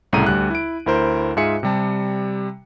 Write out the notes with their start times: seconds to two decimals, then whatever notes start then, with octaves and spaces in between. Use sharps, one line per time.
0.13 C2 A2 C#3 A#5 D#7
0.26 D2 G3 F#6
0.50 E4 D7
0.86 D2 E4 A#4 C5
1.37 G#2 F4 G#4 E5 G#5 C#7
1.63 C3 G3 A5